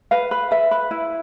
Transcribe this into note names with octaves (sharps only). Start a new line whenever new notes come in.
B4 F5
B4
B4 E5
B4
E4